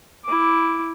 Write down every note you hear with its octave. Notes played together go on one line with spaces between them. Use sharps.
E4 D6